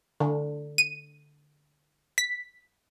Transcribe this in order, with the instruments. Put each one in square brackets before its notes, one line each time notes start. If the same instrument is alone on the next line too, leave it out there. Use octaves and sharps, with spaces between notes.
[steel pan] D3
[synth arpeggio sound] D#7
B6